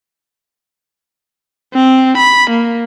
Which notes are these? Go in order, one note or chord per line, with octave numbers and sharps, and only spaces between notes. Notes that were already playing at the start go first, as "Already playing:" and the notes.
C4
B5
A#3